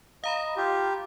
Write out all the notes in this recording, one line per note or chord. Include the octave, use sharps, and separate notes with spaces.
D#5 F5 A#5 B5
F4 G4